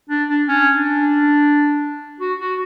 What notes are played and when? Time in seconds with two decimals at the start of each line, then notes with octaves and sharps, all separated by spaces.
0.10 D4
0.29 D4
0.48 C#4
0.76 D4
2.21 F#4
2.40 F#4